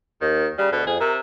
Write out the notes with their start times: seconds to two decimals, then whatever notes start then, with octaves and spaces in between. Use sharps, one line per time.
0.21 D#2 D#3
0.58 C#3 G3
0.72 D2 B2
0.87 F2 G#4
1.00 C3 A#4